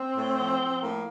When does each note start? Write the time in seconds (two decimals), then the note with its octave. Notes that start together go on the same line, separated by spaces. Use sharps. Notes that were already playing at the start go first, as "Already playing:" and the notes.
Already playing: C4
0.16 A2
0.38 F3
0.59 F3
0.82 A2 A#3